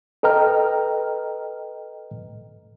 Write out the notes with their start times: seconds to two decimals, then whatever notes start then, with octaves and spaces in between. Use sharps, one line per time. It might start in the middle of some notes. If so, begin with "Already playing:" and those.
0.23 A4 B4 D#5 G5 A#5 F6